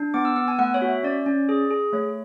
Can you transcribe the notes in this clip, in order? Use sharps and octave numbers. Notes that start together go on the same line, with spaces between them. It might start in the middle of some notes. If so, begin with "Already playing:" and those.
Already playing: D4
B3 D6
E6
B3 E6
G#5
A3 F#5
C#5
F#4
E5
C#4 D5
C#4
G#4
G#4
A3 C#5